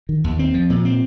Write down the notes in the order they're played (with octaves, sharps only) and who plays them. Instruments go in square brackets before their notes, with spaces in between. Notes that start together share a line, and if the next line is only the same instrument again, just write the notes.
[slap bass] D#3
D#2
C4
F3
A#2
C4